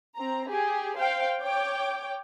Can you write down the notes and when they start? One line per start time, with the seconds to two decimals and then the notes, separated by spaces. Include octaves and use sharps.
0.15 C4 A#5
0.48 G4 G#4
0.97 C5 F5 G5
1.42 C#5 G5 D6